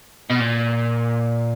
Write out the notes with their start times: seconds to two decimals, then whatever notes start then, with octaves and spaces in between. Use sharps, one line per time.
0.30 B2
0.39 A#2